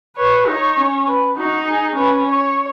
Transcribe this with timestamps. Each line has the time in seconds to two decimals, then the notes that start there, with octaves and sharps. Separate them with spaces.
0.17 B4 C#5
0.47 D#4 C#5
0.77 C#4
1.07 B4
1.37 D#4 F#4
1.67 G#4
1.96 C#4 B4
2.27 C#5